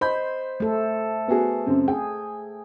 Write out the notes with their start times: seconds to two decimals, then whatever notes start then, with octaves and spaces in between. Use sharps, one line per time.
0.01 C5 D#5 B5 G6
0.60 A3 A4
1.28 B3 F#4 G#4
1.66 F#2 C#3 C4
1.88 G#4 G5